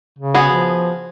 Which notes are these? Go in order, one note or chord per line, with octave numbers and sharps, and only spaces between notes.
C#3
B3 F#4 G#4
F3